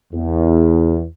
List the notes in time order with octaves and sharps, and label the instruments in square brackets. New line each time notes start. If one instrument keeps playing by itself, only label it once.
[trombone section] E2